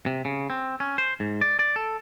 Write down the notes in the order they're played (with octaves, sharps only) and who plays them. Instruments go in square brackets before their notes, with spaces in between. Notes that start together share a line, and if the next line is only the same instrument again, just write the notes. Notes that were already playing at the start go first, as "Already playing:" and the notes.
[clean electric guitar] C3
C#3
C4
C#4
C5
G#2
D5
D5
A4